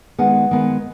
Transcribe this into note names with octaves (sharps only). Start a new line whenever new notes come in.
D#3 G#3 B3 F#5
D#3 G#3 B3